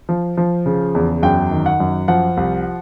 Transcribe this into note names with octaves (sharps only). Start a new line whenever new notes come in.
F3
F3
C#3
E2
F#2 G5
D#3
F#5
F#2
F3 F#5
C2